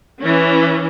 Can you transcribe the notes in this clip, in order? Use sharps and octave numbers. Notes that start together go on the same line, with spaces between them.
E3 C#4